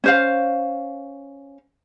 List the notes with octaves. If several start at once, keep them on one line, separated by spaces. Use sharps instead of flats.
C#4 C5 F5